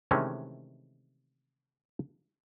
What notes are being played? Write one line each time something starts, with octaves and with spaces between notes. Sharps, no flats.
C3 D#3 E3 G#3 A3 C#4